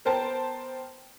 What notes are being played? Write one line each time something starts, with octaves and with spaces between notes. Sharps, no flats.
B3 A#4 C5 G5 A5